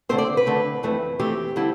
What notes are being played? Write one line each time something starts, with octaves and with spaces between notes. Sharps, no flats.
D3 A3 C4 C5
D5
B4
D3 A3 C4
F2 E3 A3 C4
F2 E3 A3 C4 G4
D3 G3 C4 E4